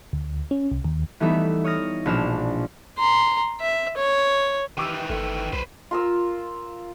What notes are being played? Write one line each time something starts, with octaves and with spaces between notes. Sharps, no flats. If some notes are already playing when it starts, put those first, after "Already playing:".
D2
C#4
C2
D#2
E3 G3 A3 B3 D#4 E5
C#5 D#6 F6 A#6
A#1 B2 D4 F6 E7
A#5 C6
E5
C#5
D#3 E3 G4 D6 E6
G1 A3 E4
B1 B4 C5
F4 A#4 E6